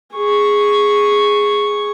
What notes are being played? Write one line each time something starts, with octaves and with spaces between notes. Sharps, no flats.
G#4 C#6